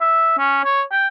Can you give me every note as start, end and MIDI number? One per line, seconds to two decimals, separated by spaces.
0.01 0.38 76
0.38 0.60 61
0.65 0.82 73
0.92 1.08 79